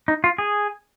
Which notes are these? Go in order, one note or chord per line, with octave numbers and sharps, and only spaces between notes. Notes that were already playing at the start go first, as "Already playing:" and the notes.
D#4
F4
G#4